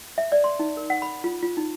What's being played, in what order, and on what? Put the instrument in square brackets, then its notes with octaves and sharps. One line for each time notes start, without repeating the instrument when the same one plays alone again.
[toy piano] E5
D5
C6
D#4
A#4
F#5
B5
F4
F4
D#4